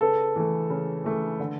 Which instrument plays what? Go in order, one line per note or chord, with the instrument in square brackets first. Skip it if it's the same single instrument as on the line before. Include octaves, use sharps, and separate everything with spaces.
[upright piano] C#3 [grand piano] A4 B4
[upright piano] E3 A3
C#3
E3 A3
D3